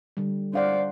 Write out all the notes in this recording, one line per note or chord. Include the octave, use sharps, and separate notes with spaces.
D3 G3
D4 C5 D5 F5 F#5